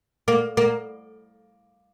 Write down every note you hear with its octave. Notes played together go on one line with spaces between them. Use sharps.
A#3
A#3